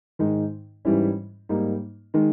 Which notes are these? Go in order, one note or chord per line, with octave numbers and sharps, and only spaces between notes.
G#2 D#3 G#3 D#4
G#2 E3 G3 C#4 E4
G#2 G3 A#3 D#4
D#3 G#3 D#4